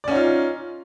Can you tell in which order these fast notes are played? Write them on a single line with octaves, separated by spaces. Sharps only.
D5 C#4 D#4 F4